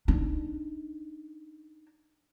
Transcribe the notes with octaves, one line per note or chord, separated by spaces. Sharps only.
D4 D#4